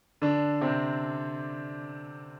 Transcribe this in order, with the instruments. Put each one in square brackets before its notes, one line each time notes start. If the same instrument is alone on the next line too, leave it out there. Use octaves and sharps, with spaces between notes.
[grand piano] D3 D4
C3 C4